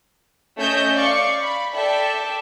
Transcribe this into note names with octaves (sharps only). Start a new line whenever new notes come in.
A3 C#4 D#5 E5 G6
D5 F5 C#6 C#7
B5
A4 D5 E5 G5